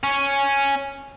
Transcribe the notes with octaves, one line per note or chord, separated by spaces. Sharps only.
C#4